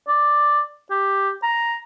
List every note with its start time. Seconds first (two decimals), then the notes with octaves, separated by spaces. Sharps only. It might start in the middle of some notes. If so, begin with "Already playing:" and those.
0.08 D5
0.91 G4
1.43 A#5